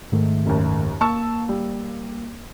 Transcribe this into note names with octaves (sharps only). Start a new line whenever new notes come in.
G#2 D#3 A3
F#1 D#2
A#3 A5 C#6 E6
G3